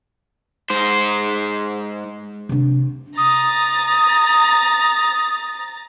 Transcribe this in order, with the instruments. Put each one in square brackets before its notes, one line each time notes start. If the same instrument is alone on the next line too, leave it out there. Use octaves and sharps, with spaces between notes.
[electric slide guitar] G#2 C5
[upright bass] C3 D4
[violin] A#5 A6 [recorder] D#6